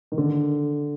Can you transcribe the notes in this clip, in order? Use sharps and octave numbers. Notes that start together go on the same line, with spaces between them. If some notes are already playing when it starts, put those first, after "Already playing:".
D#3
D3